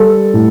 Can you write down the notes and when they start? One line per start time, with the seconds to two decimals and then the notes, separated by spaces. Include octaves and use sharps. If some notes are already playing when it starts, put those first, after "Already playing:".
Already playing: G3 A4
0.34 A2